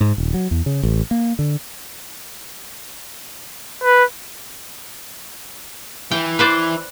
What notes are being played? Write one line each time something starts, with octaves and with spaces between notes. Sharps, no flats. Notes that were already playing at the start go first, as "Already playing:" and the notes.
G#2
D#1
F#3
E2
C#3
A1
A#3
D3
B4
E3 G5
B4 C5 D5